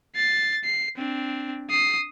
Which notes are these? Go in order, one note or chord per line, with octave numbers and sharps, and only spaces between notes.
A6 C7
C7
C4 D4
D#6 C7